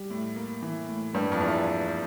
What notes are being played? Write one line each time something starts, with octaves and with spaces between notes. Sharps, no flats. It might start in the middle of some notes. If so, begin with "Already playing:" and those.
Already playing: G3
A2
A#3
E3
A2
G2 A#3
F2
E2 E3